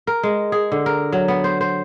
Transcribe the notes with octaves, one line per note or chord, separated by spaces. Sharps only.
A#4
G#3
G#4
D3
A#4
F#3
B3
C5
C5